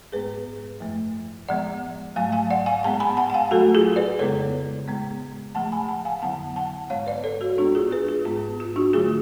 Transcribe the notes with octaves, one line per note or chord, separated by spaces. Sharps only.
G#2 G#3 B3 G#4 B4
F#2 F3 A3
A2 F3 G#3 B3 D5 F#5
G#2 F#3 A3 F5 G#5
F5 G#5
D5 F#5
F5 G#5
A2 G#3 B3 F#5 A5
G#5 B5
F#5 A5
F#5
F5 G#5
A2 F#3 A3 F#4 A4
F4 G#4
B4 D5
F2 C#3 G#3 B3 A4 C#5
A2 G#3 B3
A2 F3 A3 F#5 A5
G#5 B5
F#5 A5
F5 G#5
F2 D3 F#3 B3 F#5 A5
F#5 A5
G#2 G#3 B3 C#5 F5
B4 D5
A4 C#5
F#4 A4
A2 G#3 B3 D4 F#4
F4 G#4
G#4 B4
F4 G#4
G#2 G#3 B3 F4
F4
D4 F#4
D3 F#3 A3 F4 G#4